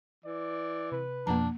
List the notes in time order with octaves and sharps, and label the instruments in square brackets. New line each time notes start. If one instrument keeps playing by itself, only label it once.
[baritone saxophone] E3 [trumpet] D5
[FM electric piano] C3 [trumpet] B4
[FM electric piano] F2 B2 F3 [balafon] A#3 A#5 [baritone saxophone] D4